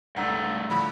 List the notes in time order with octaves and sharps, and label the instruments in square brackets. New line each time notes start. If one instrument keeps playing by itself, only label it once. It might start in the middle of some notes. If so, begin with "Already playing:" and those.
[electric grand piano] C#2 [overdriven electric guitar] G2 A3 [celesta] F#5 A#5 E6
[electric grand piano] A2 D3 F3 [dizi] B5